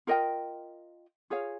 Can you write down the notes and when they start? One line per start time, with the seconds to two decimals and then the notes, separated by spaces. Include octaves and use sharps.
0.07 F4 A#4 D#5 G5
1.30 F4 G#4 C#5 F5